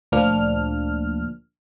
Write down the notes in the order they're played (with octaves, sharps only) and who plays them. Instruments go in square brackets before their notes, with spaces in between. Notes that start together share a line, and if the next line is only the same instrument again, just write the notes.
[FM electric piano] D2 A#2 F3 A#3 D4 F6